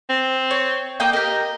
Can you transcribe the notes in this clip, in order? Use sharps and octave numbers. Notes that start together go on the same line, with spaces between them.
C4
C#5
A#3 D#5 G5
G4 A#4 D#5